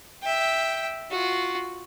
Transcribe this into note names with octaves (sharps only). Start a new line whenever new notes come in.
E5 G5
F4 F#4